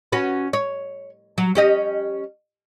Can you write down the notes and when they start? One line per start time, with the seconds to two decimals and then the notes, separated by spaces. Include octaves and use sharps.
0.12 C#4 F#4 B4
0.53 C#5
1.38 F#3
1.55 C#4 G4 D#5